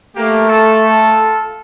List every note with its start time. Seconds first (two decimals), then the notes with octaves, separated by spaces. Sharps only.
0.16 A3 A#3 G4 A#4
0.49 F4 A4